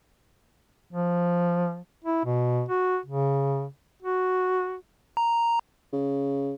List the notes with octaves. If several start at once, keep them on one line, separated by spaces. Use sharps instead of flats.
F3
E4
B2
F#4
C#3
F#4
A#5
C#3